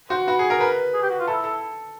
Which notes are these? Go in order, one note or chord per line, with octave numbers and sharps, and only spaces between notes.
F#4 C5
F#4 B4
G#4
A#4
A#4 B4
G#4
G4
F#4
F4
E4 A4
A4